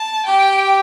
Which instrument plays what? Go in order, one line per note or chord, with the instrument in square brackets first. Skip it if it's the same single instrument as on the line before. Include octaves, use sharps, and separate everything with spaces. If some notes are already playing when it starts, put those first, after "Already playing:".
Already playing: [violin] A5
[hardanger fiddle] G4 [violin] G5